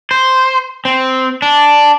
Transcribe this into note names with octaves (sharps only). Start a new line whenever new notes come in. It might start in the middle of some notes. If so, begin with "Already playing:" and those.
C5
C4
D4